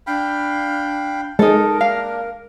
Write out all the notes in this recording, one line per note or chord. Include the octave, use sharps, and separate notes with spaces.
D4 F5 G5 B5
G#3 D#4 A4 A#4
A#3 D4 F5